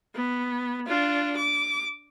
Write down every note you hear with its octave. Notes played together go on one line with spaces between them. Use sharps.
B3
D4 F4
D6